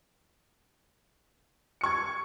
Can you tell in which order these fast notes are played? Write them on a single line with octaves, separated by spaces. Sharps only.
C#7 C#6 G#6